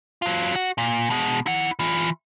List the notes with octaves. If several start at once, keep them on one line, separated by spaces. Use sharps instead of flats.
F#3 F4
F#4
A#2
B2 G#3
E4 F#5
E3 F4